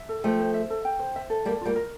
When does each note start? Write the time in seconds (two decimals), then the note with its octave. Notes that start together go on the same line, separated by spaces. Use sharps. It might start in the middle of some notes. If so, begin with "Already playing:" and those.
Already playing: E5
0.09 A4
0.24 F3 A3 G5
0.40 C5
0.54 E5
0.70 A4
0.85 G5
1.00 C5
1.16 E5
1.30 A4
1.45 G3 A#3 D5
1.61 G3 A#3 F4
1.76 A#4